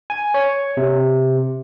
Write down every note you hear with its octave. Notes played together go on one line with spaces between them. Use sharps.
G#5
C#5
C3